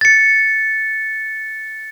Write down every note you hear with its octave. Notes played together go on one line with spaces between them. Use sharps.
A6 C#7